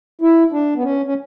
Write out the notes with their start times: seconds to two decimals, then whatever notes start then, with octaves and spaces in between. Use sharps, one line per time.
0.21 E4
0.52 D4
0.76 B3
0.83 C#4
1.06 C#4